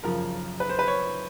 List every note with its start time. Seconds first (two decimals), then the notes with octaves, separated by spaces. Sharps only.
0.03 F#2 C#3 F3 A#4
0.60 B4
0.69 C5
0.79 B4
0.88 C#5